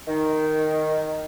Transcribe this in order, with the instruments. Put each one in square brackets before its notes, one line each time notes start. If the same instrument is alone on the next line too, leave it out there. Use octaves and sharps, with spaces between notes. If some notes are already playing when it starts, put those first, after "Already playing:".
[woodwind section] D#3